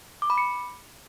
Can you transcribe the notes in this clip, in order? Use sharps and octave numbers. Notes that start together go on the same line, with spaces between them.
D6
B5
C#7